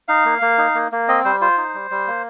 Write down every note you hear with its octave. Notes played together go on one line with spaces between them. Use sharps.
D#4 F5
A#3
A#3
D#4
A#3
A#3
C4 D#5
G3 C5
F4 C5
D#4
G3
G3
A#3